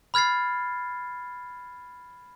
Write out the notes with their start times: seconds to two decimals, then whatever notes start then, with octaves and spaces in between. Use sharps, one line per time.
0.14 B5 F6 G#6 A6 C7